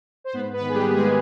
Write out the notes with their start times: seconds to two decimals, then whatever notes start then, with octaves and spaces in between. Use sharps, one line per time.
0.24 C5
0.33 G#2 B3 B4
0.53 B3 B4
0.60 D#3
0.69 G#4
0.74 G3 G4
0.87 A#3
0.94 G#3 G#4